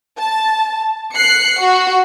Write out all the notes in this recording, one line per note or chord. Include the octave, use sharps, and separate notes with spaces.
A5
F#6 C7 C#7
F#4